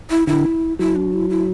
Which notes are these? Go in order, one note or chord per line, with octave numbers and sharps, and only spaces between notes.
E4
D3 E4
F#3 E4
D4
E4
E4